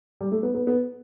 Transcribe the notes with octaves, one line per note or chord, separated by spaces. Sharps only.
G3
A3
B3
B3
B3